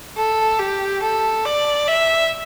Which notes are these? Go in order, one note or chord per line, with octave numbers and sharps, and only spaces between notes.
A4
G4
A4
D5
E5